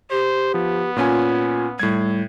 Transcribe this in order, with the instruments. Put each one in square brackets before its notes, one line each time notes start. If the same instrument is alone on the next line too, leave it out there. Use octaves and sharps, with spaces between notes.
[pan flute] G4 [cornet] C5
[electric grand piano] F3 [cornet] B3
[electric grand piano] A#2 C#4 G#5 [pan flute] F4
[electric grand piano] A2 G#6 [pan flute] G3